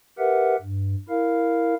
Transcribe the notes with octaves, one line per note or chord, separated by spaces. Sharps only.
G4 A#4 B4 E5 F#5
G2
E4 A#4 F5